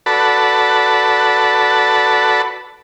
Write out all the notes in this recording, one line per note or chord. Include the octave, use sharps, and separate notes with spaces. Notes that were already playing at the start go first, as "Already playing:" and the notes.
F#4 A4 B4 D5 A5 B5